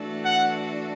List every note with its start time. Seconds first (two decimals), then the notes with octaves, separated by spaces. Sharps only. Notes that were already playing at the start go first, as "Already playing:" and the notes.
Already playing: E3 A3 D4 F#4 A4
0.24 F#5